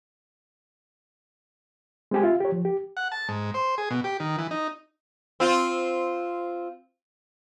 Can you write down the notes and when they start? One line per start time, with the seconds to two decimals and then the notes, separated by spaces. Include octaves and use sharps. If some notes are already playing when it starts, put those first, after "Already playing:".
2.11 G#3 C4 G4 G#5
2.23 F4 E5
2.40 G4 C#5
2.52 F3
2.65 G4
2.97 F#5
3.12 A5
3.29 G#2
3.54 C5
3.78 G#4
3.91 B2
4.04 G4
4.20 D#3
4.38 E3
4.51 D#4
5.40 C4 F4